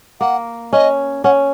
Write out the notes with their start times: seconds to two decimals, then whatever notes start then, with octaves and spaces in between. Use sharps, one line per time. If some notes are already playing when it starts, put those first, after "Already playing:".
0.20 A#3 F#5
0.73 C#4 D#5
1.24 C#4 F#5